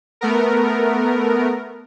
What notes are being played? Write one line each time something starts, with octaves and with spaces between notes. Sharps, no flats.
A3 B3 A#4